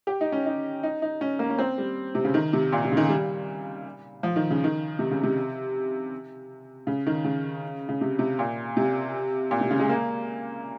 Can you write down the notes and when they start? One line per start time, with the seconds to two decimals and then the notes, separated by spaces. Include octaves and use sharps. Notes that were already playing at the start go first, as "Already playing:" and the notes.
0.07 G4
0.21 D#4
0.32 C#4
0.46 D#4
0.83 D#4
1.02 D#4
1.21 C#4
1.39 A#3
1.50 C#4
1.59 C4
1.78 G3
2.15 C3
2.25 C#3
2.34 D#3
2.53 C3
2.73 A#2
2.85 C3
2.92 C#3
2.97 D#3
3.09 G3
4.23 F3
4.36 D#3
4.50 C#3
4.64 D#3
4.99 C3
5.11 C#3
5.23 C3
6.87 C#3
7.06 D#3
7.24 C#3
7.89 C#3
8.01 C3
8.19 C3
8.39 A#2
8.77 C3
9.51 A#2
9.61 C3
9.71 C#3
9.79 G#3
9.89 A#3